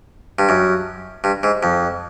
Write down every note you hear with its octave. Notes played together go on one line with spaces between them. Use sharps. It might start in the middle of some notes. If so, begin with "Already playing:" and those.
G2
F#2
G2
G#2
F2